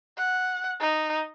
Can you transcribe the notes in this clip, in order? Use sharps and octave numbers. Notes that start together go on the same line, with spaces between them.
F#5
D#4